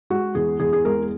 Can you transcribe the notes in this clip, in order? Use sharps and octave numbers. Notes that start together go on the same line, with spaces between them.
G#3 F#4
E2 G#4
E2 G#4
G#4
G#3 A#4